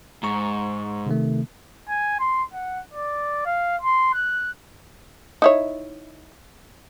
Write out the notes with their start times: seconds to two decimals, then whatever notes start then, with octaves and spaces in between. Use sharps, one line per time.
0.23 G#2 A#5 C#6
1.06 C3 D#3 A3
1.89 G#5
2.19 C6
2.54 F#5
2.93 D5
3.45 F5
3.82 C6
4.13 F#6
5.42 D#4 E4 C#5